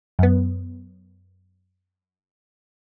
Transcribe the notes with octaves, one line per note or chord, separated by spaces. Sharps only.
F#2 B3